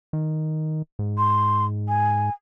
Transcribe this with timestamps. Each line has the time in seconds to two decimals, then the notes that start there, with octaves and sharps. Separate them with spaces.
0.13 D#3
0.99 G#2
1.18 C6
1.88 G#5